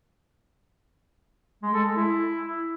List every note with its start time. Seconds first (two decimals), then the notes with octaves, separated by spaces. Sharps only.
1.63 G#3
1.74 A4
1.85 G#3
1.96 E4